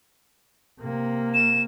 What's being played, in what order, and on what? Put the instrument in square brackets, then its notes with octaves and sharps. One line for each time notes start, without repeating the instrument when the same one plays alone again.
[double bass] C3 A#3
[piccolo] E7